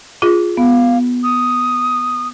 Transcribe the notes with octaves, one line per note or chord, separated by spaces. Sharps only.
F4 G#4
B3 F5
D#6